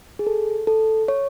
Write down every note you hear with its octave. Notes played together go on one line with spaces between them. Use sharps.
G#4
A4
A4
C#5